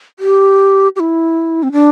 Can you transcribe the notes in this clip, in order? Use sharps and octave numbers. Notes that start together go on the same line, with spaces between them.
G4
G4
E4
C4
D4